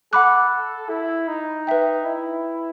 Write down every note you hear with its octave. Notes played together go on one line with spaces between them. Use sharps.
A4 F#5 B5 D6 F#6
E4
D#4
B4 E5 G5
E4